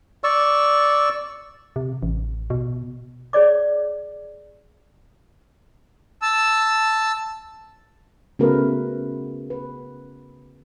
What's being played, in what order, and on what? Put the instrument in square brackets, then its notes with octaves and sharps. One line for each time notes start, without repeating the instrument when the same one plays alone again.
[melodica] D5 C#6 E6
[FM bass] C3
A1
B2
[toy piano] G#4 C#5 D5 D6
[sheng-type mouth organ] A5 E6
[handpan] C#3 A3 B3 F#4 A#4 B4
B4